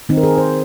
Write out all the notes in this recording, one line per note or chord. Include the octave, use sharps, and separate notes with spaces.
D#3 C4 D#4
A#4
G#4
C5